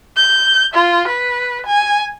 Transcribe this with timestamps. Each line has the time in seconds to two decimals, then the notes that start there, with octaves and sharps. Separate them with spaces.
0.17 G6
0.74 F4
1.08 B4
1.66 G#5